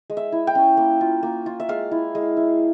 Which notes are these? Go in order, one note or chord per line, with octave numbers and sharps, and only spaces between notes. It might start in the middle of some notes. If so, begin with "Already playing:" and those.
G#3
E5
E4
G5
C#4
A#3
F4
A#3
F4
E5
G#3 F5
E4
G#3
E4